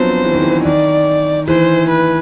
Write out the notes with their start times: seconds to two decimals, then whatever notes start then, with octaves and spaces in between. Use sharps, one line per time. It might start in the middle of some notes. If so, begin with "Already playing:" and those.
Already playing: F3 F#3 B3 C4 D4 C5
0.24 E3
0.33 D#3
0.42 E3
0.65 D#3 D5
1.48 E3 C5
1.89 B4